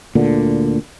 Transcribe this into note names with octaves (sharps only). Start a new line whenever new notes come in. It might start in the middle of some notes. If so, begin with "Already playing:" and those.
D2 A#2 D3